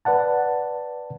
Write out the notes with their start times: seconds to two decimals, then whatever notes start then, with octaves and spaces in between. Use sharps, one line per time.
0.05 B4 D5 F#5 A5